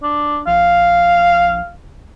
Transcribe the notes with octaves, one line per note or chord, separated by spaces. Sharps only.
D4
A#1 F5